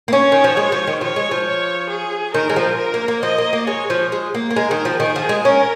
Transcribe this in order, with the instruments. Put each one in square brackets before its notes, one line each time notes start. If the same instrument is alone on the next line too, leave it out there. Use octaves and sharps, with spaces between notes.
[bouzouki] A#3
[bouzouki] C#4 [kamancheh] C#5
[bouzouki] D#3
F3
G#3
F3
D#3
[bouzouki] F3 [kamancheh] C#5
[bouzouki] G#3
F3
[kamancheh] C#5
G#4
[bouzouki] D#3 [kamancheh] A#4
[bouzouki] G#3
F3
[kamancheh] A#4
[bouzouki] A#3
A#3
[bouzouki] F3 [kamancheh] D#5
[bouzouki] A#3
A#3
[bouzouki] G#3 [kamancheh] C#5
[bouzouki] F3
G#3
A#3
A#3
[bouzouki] G#3 [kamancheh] A#4
[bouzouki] D#3
F3
[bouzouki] D#3 [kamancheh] G#4
[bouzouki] F3
G#3
[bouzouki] C#4 [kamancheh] A#4